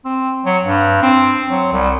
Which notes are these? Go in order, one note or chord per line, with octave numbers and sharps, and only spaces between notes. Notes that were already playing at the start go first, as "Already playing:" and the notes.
C4
F#3
G2
C4
F#3
C2